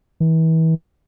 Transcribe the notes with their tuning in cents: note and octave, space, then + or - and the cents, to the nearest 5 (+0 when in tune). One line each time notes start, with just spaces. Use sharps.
E3 -35